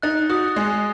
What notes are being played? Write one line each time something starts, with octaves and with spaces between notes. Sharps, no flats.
D#4 F#6 A6
F#4 D#6
G#3